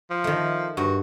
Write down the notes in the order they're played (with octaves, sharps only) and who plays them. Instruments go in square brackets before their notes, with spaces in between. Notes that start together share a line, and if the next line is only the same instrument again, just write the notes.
[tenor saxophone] F3
[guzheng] D#3 A3
[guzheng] G2 [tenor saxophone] F#4